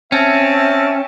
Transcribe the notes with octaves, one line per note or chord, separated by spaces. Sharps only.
C4 C#4 E5 A5